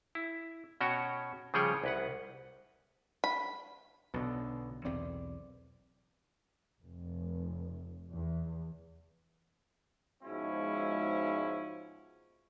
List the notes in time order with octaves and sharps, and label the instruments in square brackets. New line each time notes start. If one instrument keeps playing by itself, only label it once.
[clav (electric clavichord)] E4
B2 C#4 F#4 C#5 G5
C#3 F3 G3 G#4 C#5 G5
C2 B4 F#5
[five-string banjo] B5
[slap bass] B1 [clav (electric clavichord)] B2 D3
[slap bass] B1 E2 C4 [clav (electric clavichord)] D5
[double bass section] F1
E2
[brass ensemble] G#2 B2 F3 G#3 C#4 E4